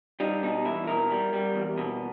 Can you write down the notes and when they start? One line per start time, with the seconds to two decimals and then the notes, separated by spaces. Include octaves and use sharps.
0.20 G3 D#4
0.43 B2 D#4
0.65 E2 E4
0.87 B2 A#4
1.11 G3
1.33 G3
1.55 E2
1.78 B2